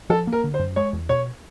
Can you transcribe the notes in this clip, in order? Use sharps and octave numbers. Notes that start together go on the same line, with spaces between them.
F3 A4
A#3
A#4
D3
C5
F#2
G#3 C#5
E2
B2 C#5